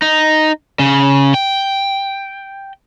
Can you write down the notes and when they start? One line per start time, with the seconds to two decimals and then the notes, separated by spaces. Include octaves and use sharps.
0.02 D#4
0.79 C#3
1.34 G5